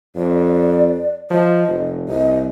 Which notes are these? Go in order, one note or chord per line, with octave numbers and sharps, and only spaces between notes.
F2 D5
F3 D#5
F1
C2 D#5